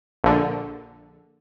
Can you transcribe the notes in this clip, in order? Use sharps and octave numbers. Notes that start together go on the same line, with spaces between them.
A#1 D3